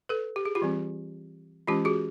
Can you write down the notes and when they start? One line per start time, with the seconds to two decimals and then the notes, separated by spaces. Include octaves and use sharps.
0.09 A4 B4
0.36 G4
0.46 G#4
0.55 F4 G4
0.62 E3 G3 C4
1.67 E3 G#3 C#4 F4 G4
1.85 F#4 G#4